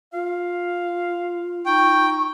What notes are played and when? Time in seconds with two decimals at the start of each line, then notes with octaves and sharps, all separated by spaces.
0.13 F4 F5
1.66 D#4 G5 C#6